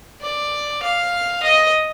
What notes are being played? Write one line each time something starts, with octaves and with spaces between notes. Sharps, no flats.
D5
F5
D#5